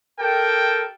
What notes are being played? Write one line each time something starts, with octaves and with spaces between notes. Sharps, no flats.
G4 A4 A#4 G5